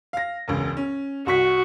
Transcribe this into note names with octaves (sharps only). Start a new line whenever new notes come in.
F5 A#6
E1 C#2
C#4
C2 F#4 C#6 B6